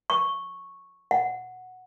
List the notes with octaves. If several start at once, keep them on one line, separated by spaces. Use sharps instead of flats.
C#6
F#5